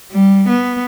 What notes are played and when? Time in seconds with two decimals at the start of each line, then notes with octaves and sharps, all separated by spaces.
0.12 G3
0.48 B3